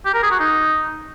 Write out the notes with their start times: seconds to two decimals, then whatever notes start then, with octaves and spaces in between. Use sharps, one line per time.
0.06 G4
0.14 A#4
0.23 G#4
0.31 F#4
0.40 D#4